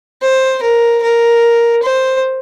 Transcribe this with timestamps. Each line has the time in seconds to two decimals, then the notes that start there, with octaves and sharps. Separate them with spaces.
0.22 C5
0.63 A#4
1.02 A#4
1.83 C5